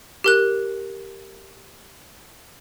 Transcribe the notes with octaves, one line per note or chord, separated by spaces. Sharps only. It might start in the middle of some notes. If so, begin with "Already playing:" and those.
G4 A#4 F#6